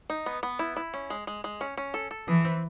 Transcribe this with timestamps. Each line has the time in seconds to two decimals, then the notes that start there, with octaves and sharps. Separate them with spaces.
0.10 D#4
0.26 B3
0.43 B3
0.59 E4
0.77 E4
0.94 C#4
1.10 G#3
1.27 G#3
1.44 G#3
1.61 C#4
1.78 C#4
1.94 A4
2.11 A4
2.28 E3 G#4
2.45 C4